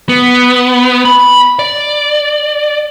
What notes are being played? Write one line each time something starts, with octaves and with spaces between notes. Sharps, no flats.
B3
B5
D5